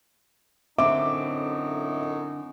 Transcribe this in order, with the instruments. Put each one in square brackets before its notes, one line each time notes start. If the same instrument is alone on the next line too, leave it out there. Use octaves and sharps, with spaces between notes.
[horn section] F#2 A2 D#4 [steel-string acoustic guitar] D3 C4 [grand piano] E5 D6